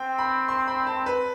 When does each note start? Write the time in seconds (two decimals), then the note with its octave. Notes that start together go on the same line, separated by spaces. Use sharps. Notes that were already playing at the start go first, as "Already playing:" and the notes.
Already playing: C4 G5
0.18 B5
0.48 C6
0.68 B5
0.87 A5
1.06 B4